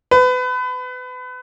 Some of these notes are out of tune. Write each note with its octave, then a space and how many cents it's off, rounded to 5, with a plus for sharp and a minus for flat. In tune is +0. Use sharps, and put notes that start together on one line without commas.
B4 +30